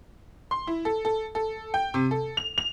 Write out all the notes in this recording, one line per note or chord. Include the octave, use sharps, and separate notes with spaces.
C6
E4
A4
A4
A4
G5
C3
A4
F7
F7